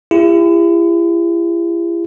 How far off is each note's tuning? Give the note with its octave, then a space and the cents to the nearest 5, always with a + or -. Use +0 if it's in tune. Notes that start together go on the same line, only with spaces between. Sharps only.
E4 +40 G4 +45